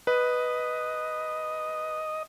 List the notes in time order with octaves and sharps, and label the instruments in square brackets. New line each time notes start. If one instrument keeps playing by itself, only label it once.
[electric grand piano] B4 [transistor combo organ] D#5